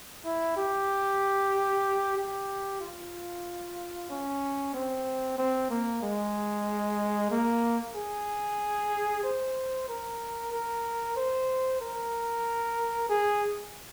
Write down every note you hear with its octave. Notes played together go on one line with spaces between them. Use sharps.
E4
G4
G4
F4
C#4
C4
C4
A#3
G#3
A#3
G#4
C5
A#4
A#4
C5
A#4
G#4